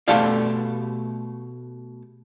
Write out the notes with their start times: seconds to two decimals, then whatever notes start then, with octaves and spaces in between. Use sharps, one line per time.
0.08 B2 A3 G4 A4 D5 F5